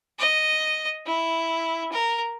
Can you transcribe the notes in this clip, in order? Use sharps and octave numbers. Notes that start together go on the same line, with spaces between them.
D#5
E4
A#4